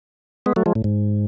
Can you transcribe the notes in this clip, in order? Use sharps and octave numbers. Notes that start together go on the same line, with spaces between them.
G#3 B3
F#3 A3
F3 G#3
A2
G#2